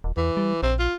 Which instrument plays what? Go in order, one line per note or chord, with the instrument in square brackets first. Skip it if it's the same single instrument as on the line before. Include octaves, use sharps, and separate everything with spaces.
[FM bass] D#1
[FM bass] E2 [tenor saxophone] E3
[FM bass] G3
[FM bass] A#1 [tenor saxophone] C4
[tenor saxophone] F4